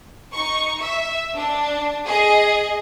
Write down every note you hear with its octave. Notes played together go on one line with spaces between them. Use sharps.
D#4 C#6
E5
D4
G#4 D#5